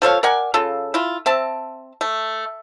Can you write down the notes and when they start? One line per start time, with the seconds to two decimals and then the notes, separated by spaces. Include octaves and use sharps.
0.02 F3 A4 C#5 F5
0.23 A#4 D5 F#5 G#5
0.54 C#3 F4 A4
0.94 E4 F4
1.26 C4 E5 A5
2.01 A3